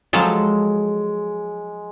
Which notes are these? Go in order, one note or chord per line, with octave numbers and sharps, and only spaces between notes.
F3 F#3 G#3 A4